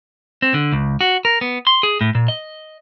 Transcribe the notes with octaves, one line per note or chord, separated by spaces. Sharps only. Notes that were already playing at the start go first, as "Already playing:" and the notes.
C4
D3
C#2
F#4
A#4
B3
C6
G#4
A2
A#2
D#5